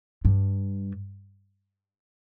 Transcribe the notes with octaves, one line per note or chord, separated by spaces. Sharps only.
G2